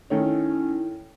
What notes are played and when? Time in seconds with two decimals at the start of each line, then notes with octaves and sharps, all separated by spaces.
0.10 D#3 A3 C#4 D#4 E4 C#5